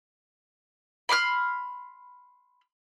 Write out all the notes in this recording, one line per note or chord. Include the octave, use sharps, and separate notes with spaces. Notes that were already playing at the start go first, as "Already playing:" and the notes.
B5 C6 D6 F6